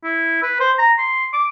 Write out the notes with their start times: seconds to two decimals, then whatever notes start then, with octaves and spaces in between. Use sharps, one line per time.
0.04 E4
0.43 B4
0.60 C5
0.78 A#5
0.98 C6
1.33 D6